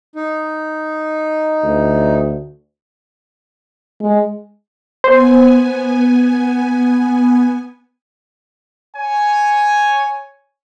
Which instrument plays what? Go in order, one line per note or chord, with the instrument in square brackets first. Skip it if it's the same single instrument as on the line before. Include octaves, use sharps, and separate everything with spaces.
[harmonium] D#4
[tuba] D2
[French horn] G#3
[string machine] B3 G#5 [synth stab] C5
[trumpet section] C#5 G#5